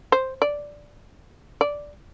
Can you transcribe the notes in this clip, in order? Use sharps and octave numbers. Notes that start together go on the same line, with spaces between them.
C5
D5
D5